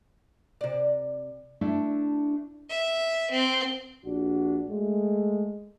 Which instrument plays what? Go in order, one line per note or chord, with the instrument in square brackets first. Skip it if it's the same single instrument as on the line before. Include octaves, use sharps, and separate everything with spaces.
[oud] C3 D5
[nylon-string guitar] A3 D4 E4 E5
[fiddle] E5
C4
[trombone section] A#1 D4 F#4
G#3 A3